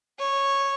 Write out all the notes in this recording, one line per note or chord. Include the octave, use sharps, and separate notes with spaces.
C#5